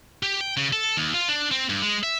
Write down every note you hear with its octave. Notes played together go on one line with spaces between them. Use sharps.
G4
G5
C#3
A4
D#2
F4
D4
C4
G2
G#3
E5